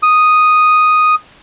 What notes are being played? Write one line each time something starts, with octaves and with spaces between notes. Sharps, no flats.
D#6